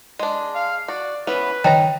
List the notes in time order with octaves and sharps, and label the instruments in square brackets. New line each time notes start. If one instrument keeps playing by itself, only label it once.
[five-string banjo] G#3 D4
[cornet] F5
[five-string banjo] F#4 [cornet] D5
[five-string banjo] E3 B3 C#4 [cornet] B4
[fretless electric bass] D#3 E3 [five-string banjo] D#4 A#5 [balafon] C#5 G5